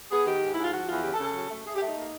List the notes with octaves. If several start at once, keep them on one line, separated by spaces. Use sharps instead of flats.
B3 G#4
D#3 G4
G#2
G#2 E4
F4
F3 F#4
E2 F4
C#3 G4
A4
C#3
A4
F#3
A3
A3 G#4
G4
A3 D#4
A#3